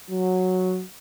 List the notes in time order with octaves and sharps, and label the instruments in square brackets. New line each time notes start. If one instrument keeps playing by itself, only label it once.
[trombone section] F#3